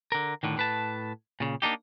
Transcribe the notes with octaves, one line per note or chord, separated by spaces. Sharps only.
D3 A#4
A2 D3 D#3
A2 B4 A5
A#2 C#3
A#3 D4 D#4 G4